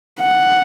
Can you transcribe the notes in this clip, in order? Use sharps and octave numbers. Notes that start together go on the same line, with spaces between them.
F#5